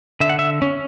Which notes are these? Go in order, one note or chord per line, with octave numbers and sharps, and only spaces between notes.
D3 E5
F#5
E5
C#4